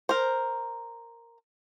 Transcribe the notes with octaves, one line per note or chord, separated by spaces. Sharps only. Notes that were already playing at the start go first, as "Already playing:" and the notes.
A#4 C5